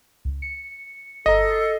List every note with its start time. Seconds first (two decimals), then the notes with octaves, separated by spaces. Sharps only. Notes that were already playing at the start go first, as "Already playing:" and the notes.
0.25 C#2
0.42 C#7
1.26 G1 A4 D#5 A#5
1.50 A6 C7